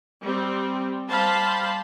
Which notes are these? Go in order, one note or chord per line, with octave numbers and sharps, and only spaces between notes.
G3 C4
G3 C5 F5 A5 B5